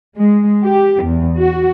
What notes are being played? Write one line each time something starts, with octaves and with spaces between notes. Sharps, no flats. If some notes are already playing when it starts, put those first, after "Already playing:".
G#3
G4
E2
F#4